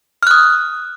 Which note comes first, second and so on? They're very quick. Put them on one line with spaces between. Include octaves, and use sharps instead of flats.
F6 F#6 D#6